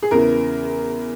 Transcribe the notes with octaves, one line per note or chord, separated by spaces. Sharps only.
G#4
E2 C#3 E3 A#4